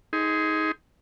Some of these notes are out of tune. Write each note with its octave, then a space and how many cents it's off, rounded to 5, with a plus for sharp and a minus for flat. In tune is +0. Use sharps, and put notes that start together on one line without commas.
D#4 +20 G#4 +0 C6 -15